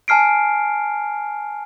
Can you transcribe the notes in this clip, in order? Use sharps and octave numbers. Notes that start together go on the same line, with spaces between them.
G#5 A5 F6 C7 D7